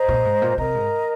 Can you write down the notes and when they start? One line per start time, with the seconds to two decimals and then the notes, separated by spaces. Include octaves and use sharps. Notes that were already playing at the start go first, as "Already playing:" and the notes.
Already playing: C5 D#5 A#5
0.08 A#2
0.25 G#2
0.42 A#2
0.58 C3 A#4 D#5 A#5
0.74 G#2